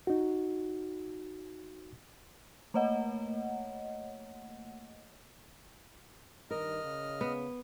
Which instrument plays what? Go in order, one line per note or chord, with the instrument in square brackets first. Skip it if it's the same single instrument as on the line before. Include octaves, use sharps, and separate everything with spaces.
[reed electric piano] D#4 F#4
[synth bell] A3 A#3 C#5 D#5 F#5
[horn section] G2 D#3 [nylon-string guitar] A#4 [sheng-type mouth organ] D#5 F6
[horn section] C#3
[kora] B3